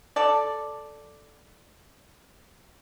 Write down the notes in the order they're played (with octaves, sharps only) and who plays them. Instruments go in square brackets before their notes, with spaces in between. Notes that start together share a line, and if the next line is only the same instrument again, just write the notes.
[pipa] A4 D5